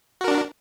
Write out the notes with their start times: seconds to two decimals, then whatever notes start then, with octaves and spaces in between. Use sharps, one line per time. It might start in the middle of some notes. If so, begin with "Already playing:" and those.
0.21 F#4
0.24 A#4
0.28 D4